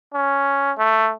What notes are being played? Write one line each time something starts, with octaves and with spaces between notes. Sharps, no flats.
C#4
A3